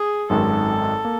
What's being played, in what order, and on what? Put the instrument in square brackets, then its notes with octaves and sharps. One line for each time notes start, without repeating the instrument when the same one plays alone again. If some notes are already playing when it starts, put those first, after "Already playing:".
Already playing: [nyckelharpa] G#4
[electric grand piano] G#1 F#2 D#3 G#3 [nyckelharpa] A4
[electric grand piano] A#3